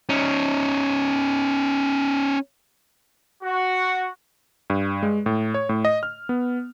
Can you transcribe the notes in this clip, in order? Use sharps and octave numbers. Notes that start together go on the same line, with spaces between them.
C#4 D#4
F#4
G2
G#3
A2
C#5
A2
D#5
F6
B3